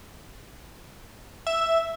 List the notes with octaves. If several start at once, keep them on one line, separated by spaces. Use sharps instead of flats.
E5